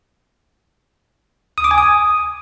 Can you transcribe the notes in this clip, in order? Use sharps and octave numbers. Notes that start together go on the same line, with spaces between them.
D#6
D6
G#5
D#6